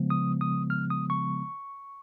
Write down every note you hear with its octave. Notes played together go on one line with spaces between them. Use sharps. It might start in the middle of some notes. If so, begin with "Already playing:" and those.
Already playing: C#3 F3 G#3 B3
D#6
D#6
F6
D#6
C#6